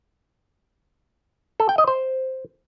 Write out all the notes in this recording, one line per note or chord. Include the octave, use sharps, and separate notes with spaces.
A4
G5
D#5
C5